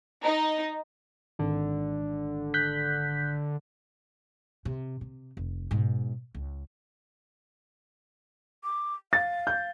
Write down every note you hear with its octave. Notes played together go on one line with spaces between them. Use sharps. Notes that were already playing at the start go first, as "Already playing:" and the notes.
D#4
G#1 D3
F#6 G6 B6
C3
C3
F1
G#2 B2
C#2
D6
F5 A6
G6